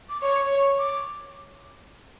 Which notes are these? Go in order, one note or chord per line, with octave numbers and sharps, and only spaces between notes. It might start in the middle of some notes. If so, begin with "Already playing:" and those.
D6
C#5 C#6
C#6
D6